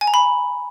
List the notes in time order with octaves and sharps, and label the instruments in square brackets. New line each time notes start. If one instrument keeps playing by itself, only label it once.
[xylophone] G#5
A#5
B5